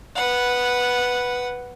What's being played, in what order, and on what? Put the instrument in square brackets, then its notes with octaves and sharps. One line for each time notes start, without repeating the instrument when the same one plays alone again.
[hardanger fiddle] B4 F#5